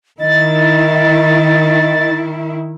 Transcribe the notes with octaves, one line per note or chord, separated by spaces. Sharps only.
D#3 E4 D#5 A6